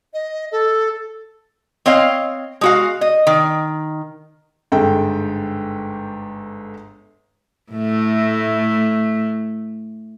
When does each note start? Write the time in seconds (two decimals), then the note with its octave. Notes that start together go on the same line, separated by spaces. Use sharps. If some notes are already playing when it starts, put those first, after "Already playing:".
0.14 D#5
0.52 A4
1.86 C4 C#5 D#5 F5
2.61 G#3 F#4 F5
3.01 D#5
3.27 D#3
4.72 G1 G#2 A4 G5
7.72 A2 A3